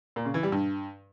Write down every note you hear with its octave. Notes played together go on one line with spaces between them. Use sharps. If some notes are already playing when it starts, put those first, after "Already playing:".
A#2
C#3
E3
G3
G2